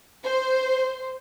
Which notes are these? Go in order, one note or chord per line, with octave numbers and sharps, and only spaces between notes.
C5